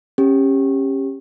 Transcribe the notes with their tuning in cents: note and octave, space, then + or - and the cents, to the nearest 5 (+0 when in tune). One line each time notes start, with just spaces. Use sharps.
C#4 -25 G4 +15